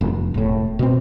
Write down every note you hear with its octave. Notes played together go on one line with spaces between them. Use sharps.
F1
E1 A2
B2 C4